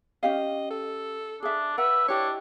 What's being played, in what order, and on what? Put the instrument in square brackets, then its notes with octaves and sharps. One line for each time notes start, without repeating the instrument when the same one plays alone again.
[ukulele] C#4 G4 F5 [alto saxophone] D#5
[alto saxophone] A4
[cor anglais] D4 [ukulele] G#4 E5
[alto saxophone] B4 [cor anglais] E5 [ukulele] F#5
[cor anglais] D4 [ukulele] E4 G4 D#5 [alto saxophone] C#5